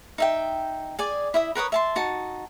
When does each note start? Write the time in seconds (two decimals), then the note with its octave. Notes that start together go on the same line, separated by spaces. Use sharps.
0.18 D#4 E5 G5
0.99 G#4 D5 G#5
1.34 E4 E5 D#6
1.55 A#4 B4 C#5 D#6
1.72 E5 A5 C6
1.96 D#4 F#4 A5